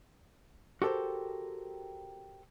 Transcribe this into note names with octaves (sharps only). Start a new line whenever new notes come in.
F#4 G4 A4 A#4 C5